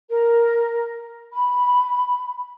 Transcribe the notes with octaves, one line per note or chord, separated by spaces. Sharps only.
A#4
B5